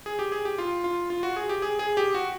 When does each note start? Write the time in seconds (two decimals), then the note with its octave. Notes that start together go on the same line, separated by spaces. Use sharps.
0.06 G#4
0.19 G4
0.32 G#4
0.45 G4
0.58 F4
0.84 F4
1.10 F4
1.23 F#4
1.36 G#4
1.49 G4
1.62 G#4
1.79 G#4
1.97 G4
2.14 F#4